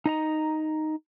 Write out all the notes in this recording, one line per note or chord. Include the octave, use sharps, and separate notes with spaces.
D#4 D#5 A#5